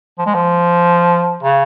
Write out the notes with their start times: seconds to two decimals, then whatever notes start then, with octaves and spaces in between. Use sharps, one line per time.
0.18 F3
0.26 G#3
0.34 F3
1.43 C#3